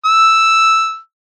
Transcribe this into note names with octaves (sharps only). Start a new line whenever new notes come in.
E6